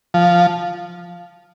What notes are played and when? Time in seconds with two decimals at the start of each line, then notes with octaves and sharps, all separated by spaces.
0.14 F3